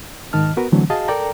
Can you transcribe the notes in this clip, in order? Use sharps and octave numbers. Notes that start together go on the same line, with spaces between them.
G#2 D#3 D#5 A5 F6
B3 F#4 A#4 B4
D3 E3 F#3 A3 C4
F#4 G#4 D#5 F5 A5
A4 A#4 D5 G5 A#5